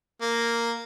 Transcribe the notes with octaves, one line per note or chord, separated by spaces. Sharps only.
A#3